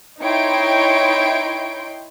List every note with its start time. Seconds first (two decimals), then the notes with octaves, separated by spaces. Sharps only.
0.21 D#4 E4 C#5 G5 C6 D7